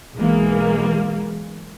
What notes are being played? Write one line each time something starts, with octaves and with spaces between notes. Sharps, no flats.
B1 E3 G#3 A#3